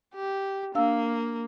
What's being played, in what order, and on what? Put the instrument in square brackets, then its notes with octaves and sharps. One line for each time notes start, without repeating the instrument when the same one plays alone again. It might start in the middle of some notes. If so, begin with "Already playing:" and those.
[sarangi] G4
[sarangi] A#3 [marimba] D4 F5 E6